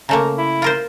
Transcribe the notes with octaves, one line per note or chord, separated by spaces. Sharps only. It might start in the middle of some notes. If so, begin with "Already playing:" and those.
C#3 A3 A#3 A#5
E4
F4 A#4 C5